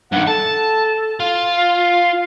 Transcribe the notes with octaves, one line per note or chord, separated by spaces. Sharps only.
G2 D#3 F#5
A4 A5
F4
F5